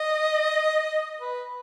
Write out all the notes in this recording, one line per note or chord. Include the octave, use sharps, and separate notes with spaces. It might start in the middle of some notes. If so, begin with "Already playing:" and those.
Already playing: D#5
B4